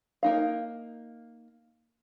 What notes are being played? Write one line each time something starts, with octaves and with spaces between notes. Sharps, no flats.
A#3 D#4 F5